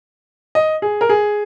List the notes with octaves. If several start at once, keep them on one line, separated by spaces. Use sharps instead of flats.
D#5
G#4
A#4
G#4